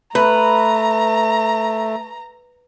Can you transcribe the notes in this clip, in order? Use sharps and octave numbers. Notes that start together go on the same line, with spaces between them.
A3 B4 A#5